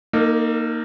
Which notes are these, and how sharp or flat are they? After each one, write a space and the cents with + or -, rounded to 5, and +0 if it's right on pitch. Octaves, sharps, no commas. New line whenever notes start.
A#3 +0 D#4 +0 A4 +45